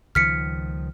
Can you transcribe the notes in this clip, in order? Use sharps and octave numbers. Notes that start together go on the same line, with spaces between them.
C#2 D#3 F3 F6 B6 C#7